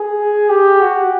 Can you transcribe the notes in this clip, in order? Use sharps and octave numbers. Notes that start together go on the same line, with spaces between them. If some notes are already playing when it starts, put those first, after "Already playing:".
Already playing: G#4
G4
F#4